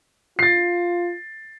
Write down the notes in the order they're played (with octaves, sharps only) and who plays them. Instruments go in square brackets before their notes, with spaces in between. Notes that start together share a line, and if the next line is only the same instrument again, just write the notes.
[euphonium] F4 [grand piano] A6 C7